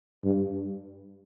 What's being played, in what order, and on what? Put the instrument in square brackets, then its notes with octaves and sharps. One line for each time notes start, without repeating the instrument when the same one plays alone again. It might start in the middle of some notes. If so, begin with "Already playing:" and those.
[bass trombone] G2